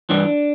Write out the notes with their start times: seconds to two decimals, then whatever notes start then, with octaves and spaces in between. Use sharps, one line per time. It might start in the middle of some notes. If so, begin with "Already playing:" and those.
0.10 G2 E3 D4